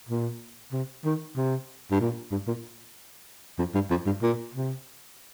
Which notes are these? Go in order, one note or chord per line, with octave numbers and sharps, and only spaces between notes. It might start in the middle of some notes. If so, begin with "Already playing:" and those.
A#2
C3
D#3
C3
G2
A#2
G2
A#2
F2
G2
F2
G2
A#2
C3